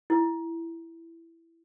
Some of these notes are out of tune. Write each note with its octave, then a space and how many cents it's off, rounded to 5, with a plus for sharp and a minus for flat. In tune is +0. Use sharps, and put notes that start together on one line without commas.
E4 +10